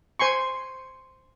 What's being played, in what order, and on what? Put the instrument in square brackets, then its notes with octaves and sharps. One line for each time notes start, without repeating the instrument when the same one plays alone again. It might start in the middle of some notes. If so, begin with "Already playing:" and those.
[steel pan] C5 G#5 C6 C#6